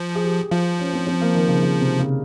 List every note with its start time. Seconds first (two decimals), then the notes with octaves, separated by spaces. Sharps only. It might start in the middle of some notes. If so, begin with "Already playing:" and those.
Already playing: F3
0.15 G#4
0.24 G4
0.51 F3 F4
0.79 C#4
0.93 C4
1.07 C4
1.21 A#3
1.35 D#3
1.48 C#3
1.62 C#3
1.81 C3
1.99 C#3